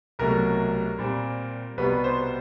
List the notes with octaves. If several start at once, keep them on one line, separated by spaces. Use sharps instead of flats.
C2 B2 F#3 A3 A#4
A#2 G3 C4
C2 B2 G3 B3 B4
C5